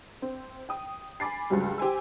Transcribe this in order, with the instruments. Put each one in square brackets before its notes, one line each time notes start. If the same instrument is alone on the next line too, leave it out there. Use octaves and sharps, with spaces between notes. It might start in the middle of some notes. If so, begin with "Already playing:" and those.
[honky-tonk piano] C4
G5 D#6
G#5 B5 D6 A6 C7
C#2 G2 F#3 G3
G4 C5 G#5 E6